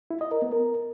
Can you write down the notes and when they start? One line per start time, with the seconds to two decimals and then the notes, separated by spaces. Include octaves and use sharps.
0.11 E4
0.21 D#5
0.31 A#4
0.42 B3
0.52 A#4